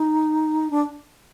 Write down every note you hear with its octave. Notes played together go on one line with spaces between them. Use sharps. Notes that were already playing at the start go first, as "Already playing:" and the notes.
Already playing: D#4
D4